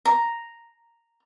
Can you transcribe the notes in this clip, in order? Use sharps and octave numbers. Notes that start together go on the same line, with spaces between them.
A#5